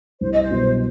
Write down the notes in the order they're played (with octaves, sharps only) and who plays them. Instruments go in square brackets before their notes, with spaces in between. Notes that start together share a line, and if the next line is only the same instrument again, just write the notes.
[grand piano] C2 [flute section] C5
[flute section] D#5
C5
[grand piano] B2 F#3 B3